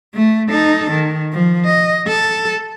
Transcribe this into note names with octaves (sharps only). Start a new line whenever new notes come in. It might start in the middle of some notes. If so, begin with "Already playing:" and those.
A3
D#4 A4
D#3
F3
D#5
A4